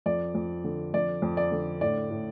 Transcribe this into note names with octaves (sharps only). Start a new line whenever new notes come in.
F2 D5
F2
D3
F2 D5
F2
D5
D3
A2 D5
A2